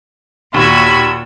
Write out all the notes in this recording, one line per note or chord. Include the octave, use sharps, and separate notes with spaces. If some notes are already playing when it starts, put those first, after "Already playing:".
D#2 A#2 F#4 B5 E6 G#6